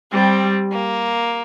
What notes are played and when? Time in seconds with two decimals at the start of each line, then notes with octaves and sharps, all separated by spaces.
0.12 G3 C4
0.72 A#3